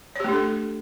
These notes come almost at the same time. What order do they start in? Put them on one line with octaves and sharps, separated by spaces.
C#5 G4 A3 D4 A4